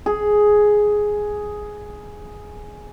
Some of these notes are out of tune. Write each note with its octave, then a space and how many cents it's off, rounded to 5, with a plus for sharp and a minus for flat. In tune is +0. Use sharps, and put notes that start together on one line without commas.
G#4 +5